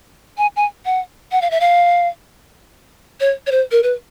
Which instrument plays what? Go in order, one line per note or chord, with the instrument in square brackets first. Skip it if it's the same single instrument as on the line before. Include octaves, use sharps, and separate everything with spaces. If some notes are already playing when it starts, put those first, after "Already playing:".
[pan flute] G#5
G#5
F#5
F#5
F5
E5
F5
C#5
C#5
C5
A#4
B4